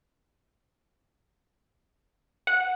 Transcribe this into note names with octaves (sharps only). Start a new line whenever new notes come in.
F#5